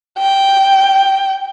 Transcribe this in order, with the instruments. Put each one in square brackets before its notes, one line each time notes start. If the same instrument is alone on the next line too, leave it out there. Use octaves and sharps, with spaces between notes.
[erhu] G5